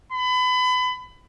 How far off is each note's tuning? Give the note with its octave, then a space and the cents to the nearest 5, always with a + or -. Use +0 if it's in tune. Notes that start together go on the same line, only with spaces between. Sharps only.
B5 +30